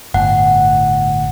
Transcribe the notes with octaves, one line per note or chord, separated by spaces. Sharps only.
G1 A2 F#5